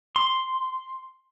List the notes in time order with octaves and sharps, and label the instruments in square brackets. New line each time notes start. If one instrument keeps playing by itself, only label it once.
[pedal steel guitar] C6